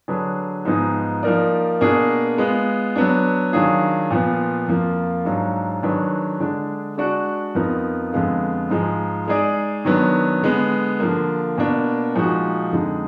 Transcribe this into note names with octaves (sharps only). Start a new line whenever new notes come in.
D3 F#3 D4 G#4 B4
G#2 F3 B3 D#4 G#4
F3 A#3 D#4 A#4 D5
B2 A#3 D4 G#4
G#3 B3 F4
F#3 B3 D4
D#3 F#3 D4 F4 G#4
A#2 F3 B3
F2 F3 A#3 F4
G#2 F#3 D4 F4
D#3 F#3 D4 G#4 B4
D3 G#3 D4
G#3 D4 F#4 D5
F2 F3 B3 D#4 A#4
F2 D3 G#3 B3 F4
G#2 F3 G#3
G#3 D#4 G#4 D5
D#3 F#3 B3 D4
D3 G#3 B3
D3 F3 A#3
B2 A#3 D4
A#2 F3 G#3 D#4 F#4
F2 D3 G#3 D#4